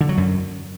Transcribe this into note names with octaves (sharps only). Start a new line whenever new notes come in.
D3
F#3
F#2